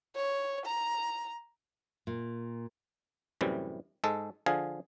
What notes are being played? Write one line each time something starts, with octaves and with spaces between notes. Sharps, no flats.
C#5
A#5
A#2
F#2 A2 C3 E3 G3
G#2 G#3 A4
D3 F3 G#4 F5 G#5